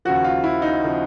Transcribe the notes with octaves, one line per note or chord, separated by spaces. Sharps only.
D#2 C#3 F3 F#4
F4
E4
D#4
C#3 F3